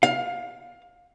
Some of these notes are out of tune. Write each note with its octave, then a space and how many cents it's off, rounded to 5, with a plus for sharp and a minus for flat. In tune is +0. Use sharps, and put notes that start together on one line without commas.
F5 +20